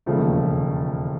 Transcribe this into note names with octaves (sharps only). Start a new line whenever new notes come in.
E1 D#2 C#3 F3 A3